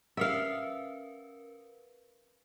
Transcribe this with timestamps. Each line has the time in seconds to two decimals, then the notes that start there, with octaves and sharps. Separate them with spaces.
0.17 C#4 A#4 B4 E5 F5